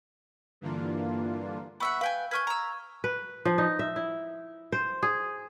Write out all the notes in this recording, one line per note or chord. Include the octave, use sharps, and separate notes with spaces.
G2 D3 E3 A#3 D4 F4
B3 E5 F#5 B5 C#6 E6
B4 F5 G5 G#5
B4 G#5 C#6 F6 G6 G#6
A#5 E6
B4
F3
D#4
E5
E4
C5
G#4